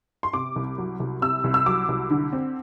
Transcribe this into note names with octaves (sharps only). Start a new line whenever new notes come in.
C6
C3 D6
C2
F#3
C2
C3 E6
C2
E6
F#3 D6
C2
D3
C4